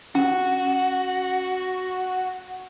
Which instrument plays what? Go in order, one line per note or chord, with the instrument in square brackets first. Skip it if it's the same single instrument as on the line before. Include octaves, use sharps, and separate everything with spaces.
[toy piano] C#4 [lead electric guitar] F#4